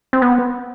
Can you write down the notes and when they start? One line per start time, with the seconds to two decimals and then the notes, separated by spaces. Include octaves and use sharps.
0.13 C4
0.22 B3